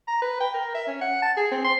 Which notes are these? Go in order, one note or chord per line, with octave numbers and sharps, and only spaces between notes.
A#5
B4
G5
A#4
E5
C#4
F#5
A5
G#4
C4
C6